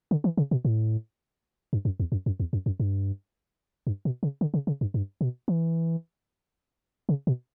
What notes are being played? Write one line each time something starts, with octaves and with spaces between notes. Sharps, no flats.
D3
E3
C#3
B2
A2
G2
F#2
E2
F#2
F#2
E2
F#2
F#2
G2
G2
B2
C#3
D3
C#3
C#3
G2
G2
B2
E3
C#3
B2